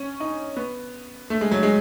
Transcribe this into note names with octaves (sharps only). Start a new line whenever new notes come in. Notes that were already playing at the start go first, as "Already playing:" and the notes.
Already playing: C#4
D#4
B3
A3
G#3
F#3
G#3